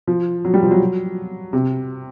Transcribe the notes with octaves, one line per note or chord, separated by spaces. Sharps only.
F3
F#3
G3
F3
F#3
C3